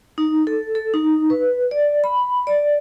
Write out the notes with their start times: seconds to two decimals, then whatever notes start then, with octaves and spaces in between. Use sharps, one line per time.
0.18 D#4
0.47 A4
0.75 A4
0.94 D#4
1.30 B4
1.71 D5
2.04 B5
2.47 D5